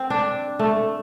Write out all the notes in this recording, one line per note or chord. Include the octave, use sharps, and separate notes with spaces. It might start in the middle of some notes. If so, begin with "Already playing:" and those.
Already playing: C4
D4
A3